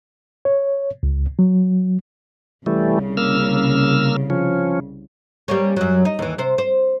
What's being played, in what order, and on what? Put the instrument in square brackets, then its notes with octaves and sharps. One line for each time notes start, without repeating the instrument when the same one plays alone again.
[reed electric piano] C#5
C#2
F#3
[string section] C2 C#3 [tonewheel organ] E3 G3 A3
[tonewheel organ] A#3 E6 F6
F3 C#4
[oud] G3 A#3 C#4
F#2 F#3
D#4
D#2 E3
C3 C5
C5